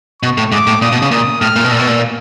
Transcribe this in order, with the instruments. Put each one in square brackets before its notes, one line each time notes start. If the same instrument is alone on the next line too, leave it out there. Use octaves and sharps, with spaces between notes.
[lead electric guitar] B2 [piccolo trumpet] C#6
[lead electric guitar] A2
[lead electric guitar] G#2 [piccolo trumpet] D6
[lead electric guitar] A2
[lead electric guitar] A#2 [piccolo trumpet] D#6
[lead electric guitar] B2
C#3
[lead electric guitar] A#2 [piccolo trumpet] D#6
[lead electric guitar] A2 [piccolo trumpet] F6
[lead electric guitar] A#2
B2
[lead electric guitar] A#2 [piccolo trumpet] E6
[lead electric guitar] B2
A#2